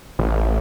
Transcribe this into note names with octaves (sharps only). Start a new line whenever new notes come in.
A1